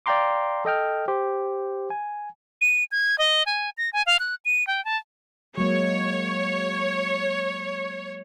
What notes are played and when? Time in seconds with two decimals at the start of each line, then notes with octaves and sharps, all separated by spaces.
0.06 D5 F5 G5 A#5 C6 D6
0.65 A4 D#5 G5 F6
1.08 G4 C5
1.90 G#5
2.61 D#7
2.92 G#6
3.18 D#5
3.46 G#5
3.77 A#6
3.93 G#5
4.06 F5
4.19 F#6
4.45 D#7
4.67 G5
4.85 A5
5.58 F#3 G#3 A#3 C#5